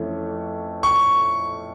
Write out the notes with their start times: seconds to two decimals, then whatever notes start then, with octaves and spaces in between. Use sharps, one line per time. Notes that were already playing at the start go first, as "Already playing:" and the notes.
Already playing: F2 E3 A3 C#4
0.83 C#6